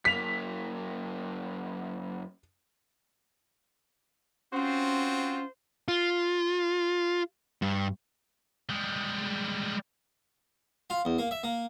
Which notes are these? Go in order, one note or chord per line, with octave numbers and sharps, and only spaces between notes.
F#2 A#3 B6 F7
C4 C#4 F4 F#4 C5
F4
G2
G3 G#3
F4
E2
A#3
E5
A#3